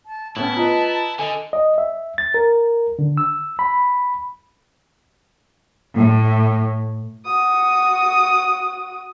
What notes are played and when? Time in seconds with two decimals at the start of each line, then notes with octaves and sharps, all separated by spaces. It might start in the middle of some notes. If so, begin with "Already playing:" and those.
0.06 A5
0.36 A2 B3 C#4 E4 A5
0.57 F4 B4 D#5 A#5
1.19 D3 A4 D#5 G#5
1.53 D#5
1.78 E5
2.18 A6
2.34 A#4
2.99 D3
3.17 E6
3.59 B5
5.96 A2
7.25 F#4 D#6